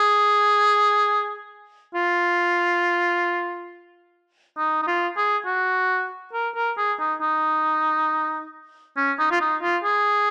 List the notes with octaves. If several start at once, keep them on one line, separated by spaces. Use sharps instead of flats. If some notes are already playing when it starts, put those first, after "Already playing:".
Already playing: G#4
F4
D#4
D#4
F4
G#4
F#4
A#4
A#4
G#4
D#4
D#4
C#4
D#4
F4
D#4
F4
G#4